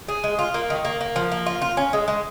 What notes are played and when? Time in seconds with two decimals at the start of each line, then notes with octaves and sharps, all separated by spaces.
0.08 G#4
0.24 G#3
0.39 F4
0.54 A#3
0.70 D#3
0.85 A#3
1.01 A#3
1.16 F3
1.32 A#3
1.46 F4
1.62 F4
1.77 C#4
1.93 G#3
2.08 G#3